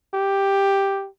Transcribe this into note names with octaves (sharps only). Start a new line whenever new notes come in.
G4